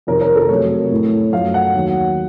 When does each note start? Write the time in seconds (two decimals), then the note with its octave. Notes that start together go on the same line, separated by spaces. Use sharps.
0.07 F2 C3 D#3 A#4
0.21 A#4
0.36 A4
0.49 F2 C3 F#3 A3 C#5
0.91 A2 A3
1.33 F#2 F3 A3 F5
1.54 F#5
1.74 D#2 D#3 F#3